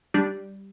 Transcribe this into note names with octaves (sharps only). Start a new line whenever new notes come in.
G3 D4